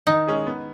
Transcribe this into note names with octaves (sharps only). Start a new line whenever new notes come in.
D#3 D#4
G#3 C#4 G#4
B3